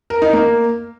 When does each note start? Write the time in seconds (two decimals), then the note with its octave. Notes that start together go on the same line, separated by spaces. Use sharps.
0.10 A#4
0.22 D#4
0.33 A#3